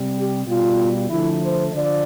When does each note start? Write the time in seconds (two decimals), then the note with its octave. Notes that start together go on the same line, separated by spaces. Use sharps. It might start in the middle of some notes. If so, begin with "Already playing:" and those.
Already playing: C3 G3
0.16 G4
0.46 B2 G3 F4
1.09 D3 F3 A3 E4
1.40 C5
1.71 D3 F3 D5